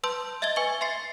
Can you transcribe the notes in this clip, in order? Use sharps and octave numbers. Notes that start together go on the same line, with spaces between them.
B4 A5 C6 E6 G6
D#5 E5 G#6 A6 G7
B4 G#5 C#6 G7
E5 C6 A6 C7 C#7